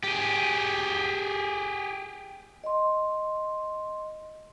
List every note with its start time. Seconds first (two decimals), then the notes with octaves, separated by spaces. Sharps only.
0.03 G4 G#4
2.64 D#5 C6